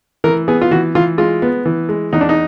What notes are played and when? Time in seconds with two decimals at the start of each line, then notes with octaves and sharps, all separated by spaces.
0.24 E3 A#4
0.48 B3 G#4
0.62 F4
0.71 E3 F#4
0.95 E3 F4
1.18 G#3 F4
1.42 B3
1.66 E3
1.89 G#3
2.13 E2 D#4
2.21 D4
2.29 D#4